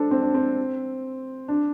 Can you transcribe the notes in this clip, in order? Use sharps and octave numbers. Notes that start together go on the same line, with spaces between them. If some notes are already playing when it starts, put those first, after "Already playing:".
Already playing: D4 A4 C5
C4
D4
C4
D4